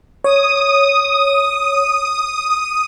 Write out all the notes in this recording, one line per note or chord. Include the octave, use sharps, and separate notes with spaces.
C#5 D#6